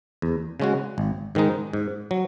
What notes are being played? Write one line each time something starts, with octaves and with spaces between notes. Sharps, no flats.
E2
C#3 G#3 C#4 F#4
G#1
G#2 D#3 G#3 D#4
G#2
F#3